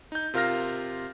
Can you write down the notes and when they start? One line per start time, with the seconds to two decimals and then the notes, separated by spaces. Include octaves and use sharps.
0.12 D#4 G6
0.34 C3 F4 A#4 F5 F6 A#6